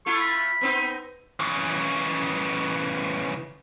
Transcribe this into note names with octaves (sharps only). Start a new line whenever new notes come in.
A3 E4 F4 C#6
B5
B3 C4 D#4
C#3 E3